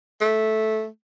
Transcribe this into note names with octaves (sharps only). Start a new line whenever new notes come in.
A3